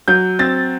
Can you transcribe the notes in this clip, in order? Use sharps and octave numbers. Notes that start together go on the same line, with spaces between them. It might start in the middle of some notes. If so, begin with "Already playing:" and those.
F#3 G6
C4 A6